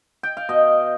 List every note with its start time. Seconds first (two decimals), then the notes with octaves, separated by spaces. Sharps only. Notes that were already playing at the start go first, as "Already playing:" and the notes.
0.23 G5
0.37 F5
0.49 B2 D#5